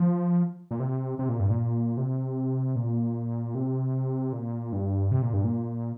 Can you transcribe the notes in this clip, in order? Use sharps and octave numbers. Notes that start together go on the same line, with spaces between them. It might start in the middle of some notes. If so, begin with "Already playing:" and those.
Already playing: F3
A#2
C3
C3
A#2
G2
A#2
C3
A#2
C3
A#2
G2
C3
A#2
G2
A#2